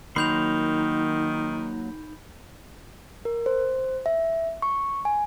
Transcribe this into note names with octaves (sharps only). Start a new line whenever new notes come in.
D#3 F#3 A#3 D#4 B5 C6 G6 F7
A#4
C5
E5
C#6
G#5